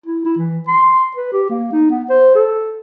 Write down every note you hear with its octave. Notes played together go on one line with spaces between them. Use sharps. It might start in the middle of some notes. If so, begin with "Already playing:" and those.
E4
E4
E3
C6
B4
G4
A#3
D#4
B3
C5
A4